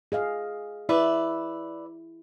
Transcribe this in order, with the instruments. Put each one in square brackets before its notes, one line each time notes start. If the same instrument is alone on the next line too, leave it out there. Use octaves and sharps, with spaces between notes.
[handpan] G#4 D#5 F5
[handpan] E4 [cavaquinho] B4 D5 E5